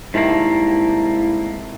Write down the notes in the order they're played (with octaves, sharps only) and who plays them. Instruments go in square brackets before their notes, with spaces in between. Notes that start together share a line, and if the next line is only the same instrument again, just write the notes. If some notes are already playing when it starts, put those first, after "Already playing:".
[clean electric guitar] G#2 G3 A#3 [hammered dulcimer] C3 D#3 A4 [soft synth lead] E4